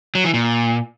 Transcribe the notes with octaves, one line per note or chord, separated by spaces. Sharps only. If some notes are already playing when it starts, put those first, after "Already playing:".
F#3
E3
A#2